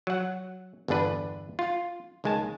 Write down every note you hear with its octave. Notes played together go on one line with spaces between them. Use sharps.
F#3 F#5
G1 E2 D3 D4 B4
F4
C#2 D#3 G#3 G#5 A5